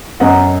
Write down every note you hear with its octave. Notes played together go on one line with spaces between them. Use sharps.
F#2 D#5 F#5